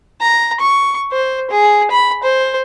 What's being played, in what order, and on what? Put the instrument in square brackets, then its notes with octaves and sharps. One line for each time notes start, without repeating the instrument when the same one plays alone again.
[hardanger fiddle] A#5
C#6
C5
G#4
B5
C5